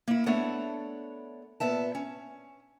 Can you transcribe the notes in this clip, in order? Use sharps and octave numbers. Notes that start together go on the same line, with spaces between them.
A#3 E4
A3 B3 D4 A4 C#5 F#5
A#2 B3 E5 A5
C#4